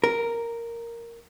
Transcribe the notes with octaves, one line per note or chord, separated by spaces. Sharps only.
A#4